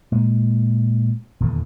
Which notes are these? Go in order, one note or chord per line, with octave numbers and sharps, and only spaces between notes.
A#2 G#3
D#1 E2 D3 E3